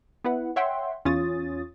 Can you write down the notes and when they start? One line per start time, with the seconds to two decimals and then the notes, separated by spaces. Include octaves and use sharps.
0.24 B3 E4 B4 F#5
0.56 C#5 E5 F#5 G5 C6
1.05 E2 C#4 F4 C#5 D#6 A6